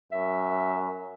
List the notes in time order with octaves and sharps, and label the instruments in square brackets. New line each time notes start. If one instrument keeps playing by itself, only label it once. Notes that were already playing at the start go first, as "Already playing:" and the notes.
[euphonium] F#2 [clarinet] E5